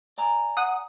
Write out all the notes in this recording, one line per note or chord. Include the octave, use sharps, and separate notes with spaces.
D5 G#5 A#5
F#5 D#6